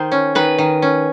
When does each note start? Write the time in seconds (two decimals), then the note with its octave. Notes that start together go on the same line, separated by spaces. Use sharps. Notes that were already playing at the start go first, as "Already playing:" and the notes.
Already playing: D#3 C5
0.12 C#4
0.35 D#3 B4
0.58 D#3
0.82 C#4